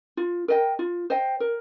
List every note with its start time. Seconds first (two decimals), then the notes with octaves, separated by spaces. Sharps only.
0.17 F4
0.48 A#4 D#5 G5
0.79 F4
1.10 C5 D#5 G5
1.40 A#4